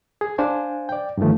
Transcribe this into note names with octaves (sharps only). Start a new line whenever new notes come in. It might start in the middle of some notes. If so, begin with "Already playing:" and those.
G#4
D4 C5 F5 G#5
D5 G5
G2 D3 D#3 F3 A3